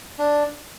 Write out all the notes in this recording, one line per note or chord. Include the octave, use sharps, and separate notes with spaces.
D4